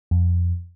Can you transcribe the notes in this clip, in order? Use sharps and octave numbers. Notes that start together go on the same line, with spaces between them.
F2